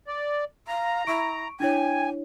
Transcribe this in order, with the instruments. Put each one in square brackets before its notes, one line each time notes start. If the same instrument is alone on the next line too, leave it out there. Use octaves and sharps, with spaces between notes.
[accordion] D5
[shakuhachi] F5 [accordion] A#5
[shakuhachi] E4 [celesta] C#6 D7
[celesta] D4 E4 C#5 [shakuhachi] G5 [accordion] G#5